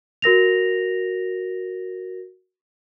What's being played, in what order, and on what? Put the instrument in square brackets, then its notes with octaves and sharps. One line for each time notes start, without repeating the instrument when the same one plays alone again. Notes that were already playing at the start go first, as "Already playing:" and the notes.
[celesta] F#4 A#4 A#6 F7